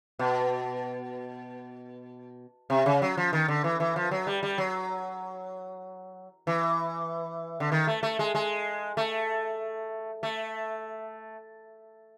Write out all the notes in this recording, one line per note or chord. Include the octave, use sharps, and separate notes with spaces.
B2
C3
C#3
F#3
F3
D#3
D3
E3
E3
F3
F#3
G3
G3
F#3
E3
D3
D#3
A3
A3
G#3
G#3
A3
A3